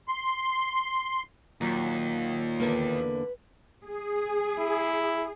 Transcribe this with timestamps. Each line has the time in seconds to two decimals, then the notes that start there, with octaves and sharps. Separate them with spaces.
0.08 C6
1.61 D#2 A#2 F#3
2.60 E2 D3 A#3 B4
3.85 G#4
4.58 E4